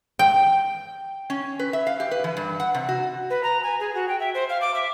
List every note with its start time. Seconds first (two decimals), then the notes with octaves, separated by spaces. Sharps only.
0.19 G5
1.30 C#4
1.59 B4
1.73 E5
1.87 F5
2.00 G4
2.11 B4
2.24 E3
2.37 G2
2.60 F#5
2.74 C3
2.89 F#4
3.30 B4
3.43 A#5
3.63 G#5
3.80 G#4
3.95 F#4
4.09 G5
4.20 E5
4.34 C5
4.49 F5
4.61 D6
4.74 E5